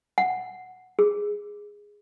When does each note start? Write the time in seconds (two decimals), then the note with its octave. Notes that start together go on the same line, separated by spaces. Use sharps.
0.18 F#5
0.99 G#4